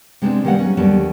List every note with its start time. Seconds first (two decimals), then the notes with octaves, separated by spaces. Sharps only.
0.22 C3 G#3 B3 C4 D4
0.45 D#3 G3 G#3 B3 F#5
0.59 F#3 C#4
0.77 D#2 D3 F#3 G3 B3 A5